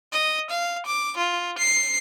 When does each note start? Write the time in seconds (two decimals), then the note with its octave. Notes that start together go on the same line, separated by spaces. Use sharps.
0.12 D#5
0.50 F5
0.86 D6
1.17 F4
1.58 C7